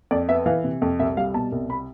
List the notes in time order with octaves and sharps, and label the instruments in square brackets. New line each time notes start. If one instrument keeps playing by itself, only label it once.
[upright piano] F2 D5
B3 E5
E3 F5
C3
F2
C2 E5
G3 F5
B2 A5
C2
B5